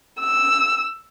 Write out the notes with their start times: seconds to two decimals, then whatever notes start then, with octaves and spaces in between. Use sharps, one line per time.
0.20 E6